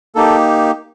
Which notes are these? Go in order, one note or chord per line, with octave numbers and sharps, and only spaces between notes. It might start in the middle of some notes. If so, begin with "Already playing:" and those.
A#3 D#4 G4 A4